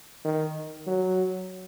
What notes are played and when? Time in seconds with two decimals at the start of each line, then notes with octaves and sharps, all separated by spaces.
0.25 D#3
0.87 F#3